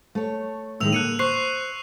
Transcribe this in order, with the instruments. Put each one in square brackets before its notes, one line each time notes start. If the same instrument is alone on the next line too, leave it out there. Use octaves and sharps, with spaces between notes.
[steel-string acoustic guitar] A3 C#5
[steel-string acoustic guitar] A2 D#3 G#3 [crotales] E6 F7
[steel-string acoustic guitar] D3 A#3 [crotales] F#6 C#7 D#7
[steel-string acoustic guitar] C5 [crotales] C#6 F#6 C7